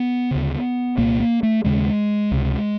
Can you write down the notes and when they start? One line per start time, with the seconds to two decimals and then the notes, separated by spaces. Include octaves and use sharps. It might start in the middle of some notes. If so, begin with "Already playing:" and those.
Already playing: B3
0.31 D2 C#3
0.98 C2 A#2 A#3
1.20 A#3
1.43 A3
1.64 D#2 C#3 G#3
2.31 C#2 C3